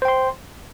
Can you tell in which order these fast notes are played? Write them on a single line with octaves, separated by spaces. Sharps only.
C5 G5 C6